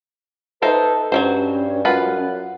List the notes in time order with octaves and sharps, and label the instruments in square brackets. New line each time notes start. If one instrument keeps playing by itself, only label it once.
[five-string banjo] D#4 C5 [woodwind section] A4 E5 [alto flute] B4
[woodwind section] G2 [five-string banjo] F#3 A3 C5 [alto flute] C#4
[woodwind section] F#2 F#5 [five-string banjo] F4 B4